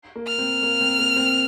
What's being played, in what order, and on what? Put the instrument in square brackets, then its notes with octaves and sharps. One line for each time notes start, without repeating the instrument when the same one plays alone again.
[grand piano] A#3
[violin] F6
[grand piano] C4
A#3
C4
A#3
C4